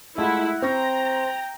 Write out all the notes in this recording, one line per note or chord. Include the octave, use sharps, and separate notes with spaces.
G#3 A3 E4 F4 F#5
C4 C5 G5 A#5 C#6 A#6